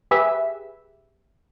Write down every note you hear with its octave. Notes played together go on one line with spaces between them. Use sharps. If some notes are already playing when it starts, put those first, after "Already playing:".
G4 G#4 B4 E5